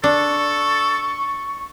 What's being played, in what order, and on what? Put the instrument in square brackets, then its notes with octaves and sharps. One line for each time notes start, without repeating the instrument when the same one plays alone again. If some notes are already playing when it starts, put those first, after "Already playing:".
[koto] D4 [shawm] A4 [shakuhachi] C#6